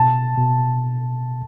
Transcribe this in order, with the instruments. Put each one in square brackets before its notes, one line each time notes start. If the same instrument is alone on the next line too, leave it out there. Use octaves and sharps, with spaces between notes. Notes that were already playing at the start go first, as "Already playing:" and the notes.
Already playing: [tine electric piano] B2 [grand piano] A5
[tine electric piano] B2